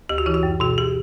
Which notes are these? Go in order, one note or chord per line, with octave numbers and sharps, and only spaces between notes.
D2 G4
F#4
E3 E4
F#4
F#2
B2 F#4
G4